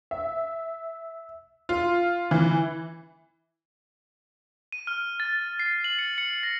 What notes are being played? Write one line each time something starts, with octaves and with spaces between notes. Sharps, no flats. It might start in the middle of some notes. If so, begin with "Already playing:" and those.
E5
F4
E3
D#7
F6
A6
C7
F#7
C#7
C#7
A#6